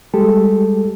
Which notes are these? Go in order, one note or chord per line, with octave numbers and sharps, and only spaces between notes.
G3 G#3 G4 A4